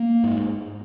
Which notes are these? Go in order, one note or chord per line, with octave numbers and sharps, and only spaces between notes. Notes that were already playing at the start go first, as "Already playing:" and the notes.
Already playing: A#3
G#2